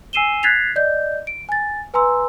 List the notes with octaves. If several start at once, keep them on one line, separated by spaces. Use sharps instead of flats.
G#5 E6 C7 D#7 E7 G7
F#6 G#6 A6 B6 C7 F7
D5 D#5 G6
D7
G#5 A6
B4 G#5 A#5 C6 E6